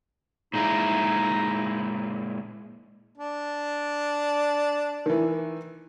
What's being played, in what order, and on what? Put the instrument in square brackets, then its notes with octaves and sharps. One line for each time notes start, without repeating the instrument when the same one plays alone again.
[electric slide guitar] A#2 G#3 E4 [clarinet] D#4
[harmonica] D4
[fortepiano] D#3 E3